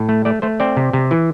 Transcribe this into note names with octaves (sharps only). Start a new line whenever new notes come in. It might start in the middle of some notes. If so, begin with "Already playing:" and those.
Already playing: A2
A3
A3 D5
A3 C5
C4 D5
C3
C3
E3